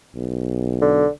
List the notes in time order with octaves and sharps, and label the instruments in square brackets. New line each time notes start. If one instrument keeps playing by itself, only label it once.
[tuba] B1
[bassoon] D3